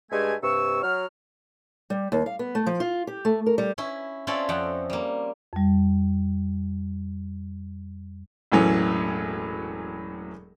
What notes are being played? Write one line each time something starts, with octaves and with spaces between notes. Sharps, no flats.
G2 G#3 A3 G#5
G2 C3 C#6 E6
F#3 F6
G3
D#2
F5
B3
A3
F3
F4
G4
A3
A#4
G3
C#4 E4
C4 C#4 E4 F4 A4 D5
F2 F#5 G5
G3 A#3
F2 G3
E1 A2 E3 F#3 C#4